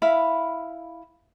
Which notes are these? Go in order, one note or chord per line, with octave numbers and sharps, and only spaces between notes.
E4 F5 B5